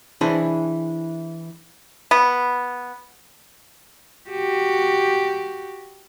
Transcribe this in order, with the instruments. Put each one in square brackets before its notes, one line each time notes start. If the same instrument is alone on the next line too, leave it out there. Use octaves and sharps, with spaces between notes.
[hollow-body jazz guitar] E3 D4 E4 G#4 C5
[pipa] B3
[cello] F#4 G4